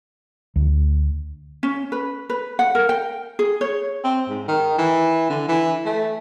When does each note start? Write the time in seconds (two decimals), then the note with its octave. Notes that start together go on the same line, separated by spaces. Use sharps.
0.56 D2
1.63 C#4
1.92 B4
2.30 B4
2.59 F#5
2.75 A#4
2.89 G5
3.39 G#4
3.61 C#5
4.04 C4
4.29 G#2
4.48 D#3
4.78 E3
5.30 D3
5.48 E3
5.85 A3